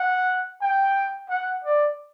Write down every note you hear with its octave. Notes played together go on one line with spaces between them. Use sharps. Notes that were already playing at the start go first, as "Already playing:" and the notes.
Already playing: F#5
G5
F#5
D5